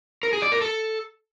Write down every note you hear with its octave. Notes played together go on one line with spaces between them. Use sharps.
A#4
G#4
D5
A#4
A4